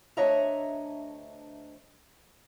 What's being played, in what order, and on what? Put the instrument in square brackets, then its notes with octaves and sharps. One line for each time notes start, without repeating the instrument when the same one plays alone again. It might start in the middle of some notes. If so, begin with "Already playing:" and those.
[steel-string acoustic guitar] D2 D4 C#5 D#5 E5 A#5